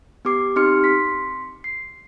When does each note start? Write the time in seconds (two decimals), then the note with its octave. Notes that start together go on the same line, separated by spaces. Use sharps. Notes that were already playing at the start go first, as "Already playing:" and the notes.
0.25 B3 G4 D6 C7
0.56 C4 D#4 G4 C6 F6 C#7
0.84 C6 B6
1.64 C7